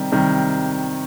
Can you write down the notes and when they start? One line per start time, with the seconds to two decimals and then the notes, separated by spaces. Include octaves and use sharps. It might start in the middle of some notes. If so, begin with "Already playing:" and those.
Already playing: C3 D#3 G3
0.12 C3 D#3 G3